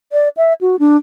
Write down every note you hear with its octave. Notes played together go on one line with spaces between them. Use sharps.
D5
E5
F#4
D4